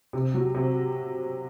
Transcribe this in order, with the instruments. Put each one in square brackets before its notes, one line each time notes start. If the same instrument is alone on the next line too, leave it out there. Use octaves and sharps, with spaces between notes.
[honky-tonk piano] C3
F#3
C3